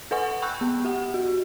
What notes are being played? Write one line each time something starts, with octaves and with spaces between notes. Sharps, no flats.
A4 B4 D#5 F#5 G#5 C#6
G5 B5 C#6 E6 F#6 G6
B3
G4 F#5
F#4